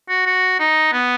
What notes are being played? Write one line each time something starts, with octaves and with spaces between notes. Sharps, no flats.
F#4
F#4
D#4
B3